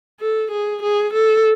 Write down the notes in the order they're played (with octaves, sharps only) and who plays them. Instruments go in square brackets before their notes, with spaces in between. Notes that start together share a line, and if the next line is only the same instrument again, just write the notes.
[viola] A4
G#4
G#4
A4